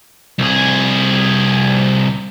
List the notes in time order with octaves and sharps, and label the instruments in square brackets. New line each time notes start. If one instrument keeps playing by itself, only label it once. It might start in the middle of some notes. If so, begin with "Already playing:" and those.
[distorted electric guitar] C2 G#4